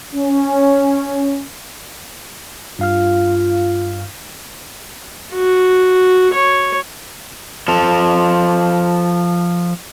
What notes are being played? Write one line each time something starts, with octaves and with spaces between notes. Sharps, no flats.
C#4
G2 F4 F5 F6
F#4
C#5
F3 A4